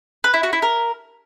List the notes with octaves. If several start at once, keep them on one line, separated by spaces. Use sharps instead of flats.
B4
E4
F#4
E4
A#4